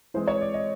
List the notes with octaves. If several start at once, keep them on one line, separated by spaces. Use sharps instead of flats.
E3 G#3 C4 C5
C#5
D5
D#5